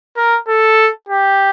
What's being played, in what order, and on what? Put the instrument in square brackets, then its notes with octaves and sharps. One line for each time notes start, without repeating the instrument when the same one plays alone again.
[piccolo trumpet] A#4
A4
G4